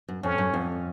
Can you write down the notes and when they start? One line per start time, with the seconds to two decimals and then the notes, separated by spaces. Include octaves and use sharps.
0.08 F#2
0.23 F2 C#4
0.38 F#2
0.54 F2